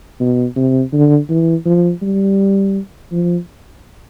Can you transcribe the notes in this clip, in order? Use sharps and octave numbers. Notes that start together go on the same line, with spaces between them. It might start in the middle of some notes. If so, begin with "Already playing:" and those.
B2
C3
D3
E3
F3
G3
F3